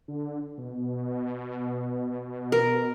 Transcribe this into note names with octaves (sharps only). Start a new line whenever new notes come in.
D3
B2
A#4